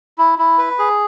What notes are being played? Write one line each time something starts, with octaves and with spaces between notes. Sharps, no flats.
E4
E4
B4
G#4